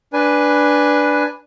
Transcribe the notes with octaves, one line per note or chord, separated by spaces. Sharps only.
D4 B4 G#5